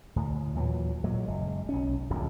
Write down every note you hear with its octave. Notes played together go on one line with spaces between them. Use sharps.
D2 A2
D#2 A#2 E3 F#3
A#2 F#3 G#3
F#1 G#3
B1 C#4
D1 A#1 F#2